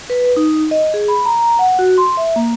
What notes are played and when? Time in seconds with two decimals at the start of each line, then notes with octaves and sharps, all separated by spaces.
0.10 B4
0.37 D#4
0.71 D#5
0.94 G#4
1.08 B5
1.26 A#5
1.59 F#5
1.79 F#4
1.98 C6
2.17 E5
2.36 A#3